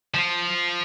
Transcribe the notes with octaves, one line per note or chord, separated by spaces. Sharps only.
F3 F4